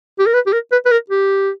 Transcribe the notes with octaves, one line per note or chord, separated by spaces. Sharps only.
G4
A#4
B4
G4
A#4
B4
B4
A#4
G4